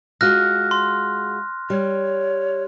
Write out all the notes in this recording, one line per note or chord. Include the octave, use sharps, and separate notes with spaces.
G#3 F4 F#4 F6 F#6 A#6
C6
G3 C#5